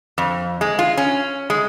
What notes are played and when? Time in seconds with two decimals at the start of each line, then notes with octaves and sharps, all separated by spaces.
0.18 F2
0.61 G#3
0.79 F4
0.97 C#4
1.50 G#3